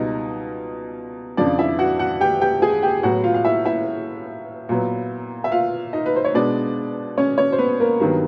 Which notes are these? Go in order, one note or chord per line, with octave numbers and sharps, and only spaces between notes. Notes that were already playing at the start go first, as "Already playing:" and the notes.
Already playing: C#2 B2 G3 D#4 D#5
F2 C#3 F3 D4 D5
E4 E5
F#4 F#5
F#4 F#5
G4 G5
G4 G5
G#4 G#5
G4 G5
A2 F#3 B3 F#4 F#5
F4 F5
F5
E4 E5
E4 E5
A#2 F#3 B3
E5
F4 F5
D#4 D#5
B4
C5
C#5
B2 G#3 B3 D4 D5
C#4 C#5
C#4 C#5
C5
B3 B4
A#3 A#4
G2 D#3 F#3 B3